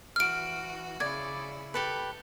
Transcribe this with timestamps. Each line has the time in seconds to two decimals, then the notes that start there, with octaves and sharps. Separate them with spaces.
0.16 E3 F#4 F6 D7
1.00 C#3 E4 D5 G#6
1.74 G4 A4 B4